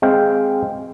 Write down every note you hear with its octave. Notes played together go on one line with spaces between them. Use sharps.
G#3 C4 F5 G5